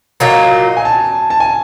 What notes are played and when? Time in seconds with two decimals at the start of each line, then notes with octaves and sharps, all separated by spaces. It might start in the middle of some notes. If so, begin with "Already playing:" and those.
0.20 A#2 F#3 A#3 D#4
0.77 G#5
0.85 A5
1.30 A5
1.40 G#5